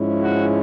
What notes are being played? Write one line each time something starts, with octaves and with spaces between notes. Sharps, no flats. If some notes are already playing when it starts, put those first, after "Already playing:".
Already playing: G#2 F3 G#3 C#4 E4
F#4